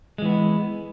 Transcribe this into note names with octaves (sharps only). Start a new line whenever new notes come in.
E3 G#3 B3